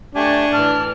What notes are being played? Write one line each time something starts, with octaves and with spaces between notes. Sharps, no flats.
A3 D4 G4 G#5 A5 C#6
A2 E3 A5 F6